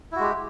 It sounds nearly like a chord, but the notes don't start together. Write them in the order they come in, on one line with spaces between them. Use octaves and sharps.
E4 F#4 G#3 G4